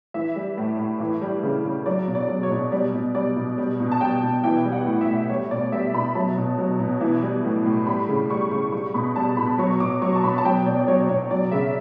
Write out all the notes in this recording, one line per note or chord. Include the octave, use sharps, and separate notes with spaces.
E3 E5
G3
A2
A2
E3
G3
C#3
C#3
F#3 D5
B2
D5
F#3
C#5
B2
G3 D5
B2
G3 D5
B2
G3
B2
A5
G3 G5
B2
E3 G5
G3
F#5
A2
E5
A2
G3 C#5
B2 D5
G3 E5
B2 B5
F#3 A5
B2
F#3
B2
E3
G3
A2
A2
G3 B5
C#3
G3 C#6
C#3 C#6
G3 C#6
B2 B5
G3 A5
B2 B5
F#3 C#6
B2 D6
F#3 C#6
A5
B2 B5
A5
F#3 G5
B2 D5
D5
F#3 C#5
D5
B2 C#5
C#5
F#3 D5
C#3 E5